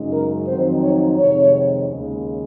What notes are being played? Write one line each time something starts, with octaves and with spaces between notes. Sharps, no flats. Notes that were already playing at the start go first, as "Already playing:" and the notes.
Already playing: F#2 C#3 G#3 D#4
A#4
F2 D#3 F#3 C4 D#4 C5
C#5
F2 C3 D#3 G#3 C#5
D#2 C#3 G#3